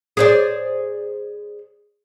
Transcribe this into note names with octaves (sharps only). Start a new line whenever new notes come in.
G#4 C5 D5